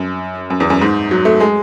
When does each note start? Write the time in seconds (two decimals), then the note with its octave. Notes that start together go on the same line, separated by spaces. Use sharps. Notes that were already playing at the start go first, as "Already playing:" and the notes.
Already playing: F#2
0.50 F#2
0.60 E2
0.70 F#2
0.81 G#2
1.11 F#3
1.25 A3
1.40 G#3